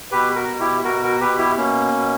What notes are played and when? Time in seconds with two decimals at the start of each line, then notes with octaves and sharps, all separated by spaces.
0.11 B2 G4 B4
0.36 F#4 A#4
0.48 B2
0.60 E4 G4
0.84 B2 F#4 A#4
1.03 F#4 A#4
1.21 B2 G4 B4
1.39 E4 G4
1.57 B2 A#3 C#4
1.94 B2